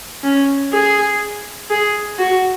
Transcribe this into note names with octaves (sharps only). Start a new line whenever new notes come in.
C#4
G#4
G#4
F#4